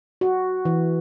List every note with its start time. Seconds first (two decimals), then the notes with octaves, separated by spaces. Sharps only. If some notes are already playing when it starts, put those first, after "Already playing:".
0.21 F#4
0.65 E3